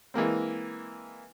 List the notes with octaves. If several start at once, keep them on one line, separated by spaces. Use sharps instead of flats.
E3 G#3 A#3 C4